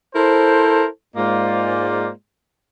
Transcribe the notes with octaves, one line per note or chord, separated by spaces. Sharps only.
E4 A4 A#4 C5
G#2 G#3 A#3 F4 C5 D5